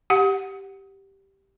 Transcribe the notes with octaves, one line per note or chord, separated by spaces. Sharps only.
G4 F#5